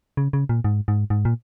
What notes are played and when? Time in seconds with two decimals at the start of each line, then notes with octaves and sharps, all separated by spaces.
0.17 C#3
0.33 C#3
0.49 A#2
0.64 G#2
0.88 G#2
1.10 G#2
1.25 A#2